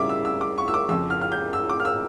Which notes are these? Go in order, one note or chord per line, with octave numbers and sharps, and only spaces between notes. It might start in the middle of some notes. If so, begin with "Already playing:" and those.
Already playing: C#3 G3 C#4 E4 E5 D6
E6
E6
D6
C#6
E6
D6
F2 C#3 F3 E6
F6
F6
G6
E6
D6
F6
E6